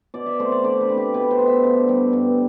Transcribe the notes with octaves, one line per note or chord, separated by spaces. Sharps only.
B2 D5
E5
A3 C4 C5
D5
D3 D5
B4
A3 C4
G4
B2 B4
C5
B3
E5
D3
G3 B3
G2